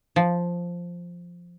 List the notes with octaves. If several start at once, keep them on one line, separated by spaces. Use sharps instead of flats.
F3